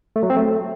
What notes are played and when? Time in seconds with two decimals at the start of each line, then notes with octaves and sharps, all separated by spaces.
0.16 A3
0.23 F#3
0.30 C4
0.37 A3